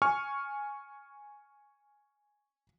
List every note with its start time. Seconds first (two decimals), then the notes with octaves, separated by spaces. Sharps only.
0.02 G#5 C#6 F6